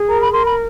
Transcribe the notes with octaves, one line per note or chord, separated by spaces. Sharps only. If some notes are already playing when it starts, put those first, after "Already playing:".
Already playing: G#4
A#4 A#5
B5
A#4 C6
B5